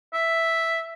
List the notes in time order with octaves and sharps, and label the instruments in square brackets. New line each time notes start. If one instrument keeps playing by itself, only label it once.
[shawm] E5